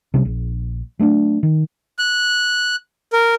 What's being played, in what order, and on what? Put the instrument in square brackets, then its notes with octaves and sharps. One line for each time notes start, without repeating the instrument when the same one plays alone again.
[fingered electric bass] C3 G3 C#4
A#1
F#3 A3 B3 D4
D#3
[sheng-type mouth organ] F#6
A#4